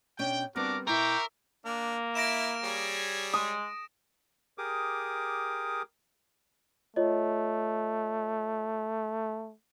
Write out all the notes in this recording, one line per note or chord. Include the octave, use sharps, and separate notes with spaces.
B2 C#4 D4 G5
G3 B3 C4 D4 F#4 A#4 D6
B2 E4 A#4 E5 G5 C#6 D6
A#3 D4
E4 A#6 D7 E7
G3 G#4 C#5
G#3 D#6
G4 G#4 A#4 D6 D#6
A3 F4 C#5 D#5